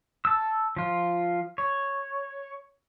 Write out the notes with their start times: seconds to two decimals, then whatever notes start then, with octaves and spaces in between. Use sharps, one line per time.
0.25 A5 E6
0.77 F3 F4
1.58 C#5